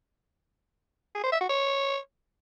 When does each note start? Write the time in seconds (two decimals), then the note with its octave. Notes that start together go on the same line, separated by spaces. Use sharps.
1.15 G#4
1.24 C5
1.32 E5
1.41 F#4
1.49 C#5